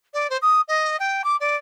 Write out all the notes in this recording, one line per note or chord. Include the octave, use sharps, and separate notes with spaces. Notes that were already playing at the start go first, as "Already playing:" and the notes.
D5
C5
D#6
D#5
G5
D6
D5